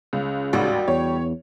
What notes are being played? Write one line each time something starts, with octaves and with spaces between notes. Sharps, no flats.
C#2 C#3
A1 D#2 G#2 G3 F#4
E2 C#5